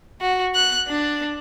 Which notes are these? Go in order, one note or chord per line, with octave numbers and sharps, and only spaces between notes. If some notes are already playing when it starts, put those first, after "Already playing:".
F#4
F#6
D4